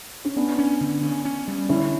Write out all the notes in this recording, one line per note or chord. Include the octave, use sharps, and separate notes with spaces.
C#4
B3 C#4 D4
C#4
D3
C#4
C#4
G3
D3 C#4 E4